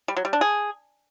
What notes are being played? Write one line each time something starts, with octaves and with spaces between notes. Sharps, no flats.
G3
F#3
G3
D4
G#4